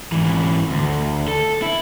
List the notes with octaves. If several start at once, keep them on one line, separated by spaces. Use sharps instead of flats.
G#2 E3
D2
A4
E4